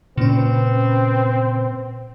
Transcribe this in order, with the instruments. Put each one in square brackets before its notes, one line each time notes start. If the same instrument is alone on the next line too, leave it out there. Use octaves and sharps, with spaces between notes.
[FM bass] A#2 [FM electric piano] C#3 C#4 [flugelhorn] C4 [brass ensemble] B4